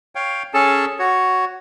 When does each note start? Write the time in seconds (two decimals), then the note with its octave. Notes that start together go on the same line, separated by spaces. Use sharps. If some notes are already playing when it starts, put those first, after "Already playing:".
0.15 C#5 F5 G5
0.54 C#4 G#4 A4 A5
0.99 F#4 C#5